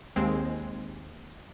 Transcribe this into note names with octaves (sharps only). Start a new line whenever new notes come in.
D#2 G#3 C4